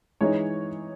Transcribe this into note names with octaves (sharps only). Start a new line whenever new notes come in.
E3 G#3 D#4 C#5